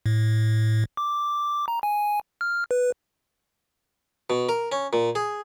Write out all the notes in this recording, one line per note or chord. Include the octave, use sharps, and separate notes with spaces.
A2
D6
A#5
G#5
F6
B4
B2
A#4
C#4
A#2
G#4